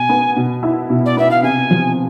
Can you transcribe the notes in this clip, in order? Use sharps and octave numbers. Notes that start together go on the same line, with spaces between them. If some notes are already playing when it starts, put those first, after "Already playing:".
Already playing: B2 G#5
B3
B2
E4
B2
D5
B3 E5
F5
C3 G#5
F3